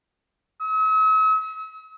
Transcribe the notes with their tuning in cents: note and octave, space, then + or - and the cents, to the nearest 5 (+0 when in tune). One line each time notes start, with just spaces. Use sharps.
E6 -45